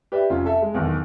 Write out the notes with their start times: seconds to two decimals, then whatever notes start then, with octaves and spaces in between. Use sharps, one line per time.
0.12 G4 B4 D5 E5
0.30 F1 C#4 F4
0.46 A4 E5
0.62 G#3
0.74 B1 E2 B2 D#3